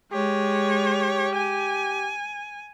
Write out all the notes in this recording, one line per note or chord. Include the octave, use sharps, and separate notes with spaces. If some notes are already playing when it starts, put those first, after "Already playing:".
G#3 G4 C#5
G#5